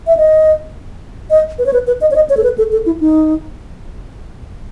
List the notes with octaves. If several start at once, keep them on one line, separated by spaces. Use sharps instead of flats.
E5
D#5
D#5
B4
C#5
B4
B4
D#5
C#5
D#5
C#5
A4
B4
A4
A4
E4
D#4